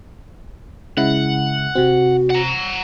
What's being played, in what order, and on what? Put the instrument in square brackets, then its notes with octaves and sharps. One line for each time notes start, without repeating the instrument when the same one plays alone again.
[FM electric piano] C#3 G#3 E4 [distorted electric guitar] F#5
[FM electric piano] C3 C4 [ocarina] F#4
[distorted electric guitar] F#5 A#5